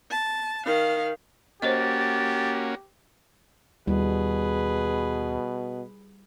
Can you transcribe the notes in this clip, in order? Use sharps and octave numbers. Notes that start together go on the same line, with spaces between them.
A5
D#3 F5
A#3 C#4 F#4 G4 C5 C#5 D#5 A6
D#2 B2 G3 E4 G#4 B4